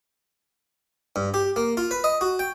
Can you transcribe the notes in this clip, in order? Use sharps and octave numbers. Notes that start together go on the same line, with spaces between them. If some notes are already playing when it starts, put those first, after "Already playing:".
G2
G4
A#3
F4
B4
D#5
F#4
G5